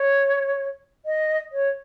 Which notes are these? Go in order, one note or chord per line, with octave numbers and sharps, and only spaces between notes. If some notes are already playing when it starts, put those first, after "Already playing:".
Already playing: C#5
D#5
C#5